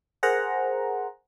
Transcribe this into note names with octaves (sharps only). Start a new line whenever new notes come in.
G#4 A#4 C5 F#5 A#5